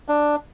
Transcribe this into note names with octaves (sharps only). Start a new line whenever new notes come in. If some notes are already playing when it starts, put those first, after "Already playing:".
D4